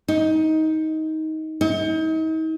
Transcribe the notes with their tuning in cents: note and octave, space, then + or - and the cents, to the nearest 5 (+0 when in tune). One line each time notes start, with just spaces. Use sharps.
D#4 +20
D#4 +40